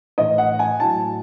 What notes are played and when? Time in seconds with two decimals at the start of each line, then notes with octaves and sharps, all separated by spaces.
0.18 A2 E3 D#5
0.38 F#5
0.59 G#5
0.80 A2 F#3 A5